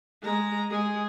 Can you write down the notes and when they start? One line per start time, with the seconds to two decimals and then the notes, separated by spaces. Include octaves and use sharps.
0.22 G#3 A#5
0.70 G#3 G#4